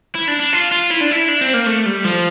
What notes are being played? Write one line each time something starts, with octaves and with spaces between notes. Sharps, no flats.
E4
D4
D4
F4
F4
E4
D4
E4
D4
C4
A#3
A3
G3
F3